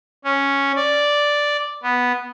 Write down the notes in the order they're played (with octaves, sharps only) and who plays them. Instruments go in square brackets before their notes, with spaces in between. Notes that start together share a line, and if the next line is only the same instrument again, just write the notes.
[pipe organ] C#4
D5
B3